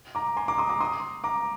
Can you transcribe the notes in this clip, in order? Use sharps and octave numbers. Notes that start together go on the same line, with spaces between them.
A#5 D6
G#5 C6
A#5 D6
C6 D#6
A#5 D6
C6 D#6
A#5 D6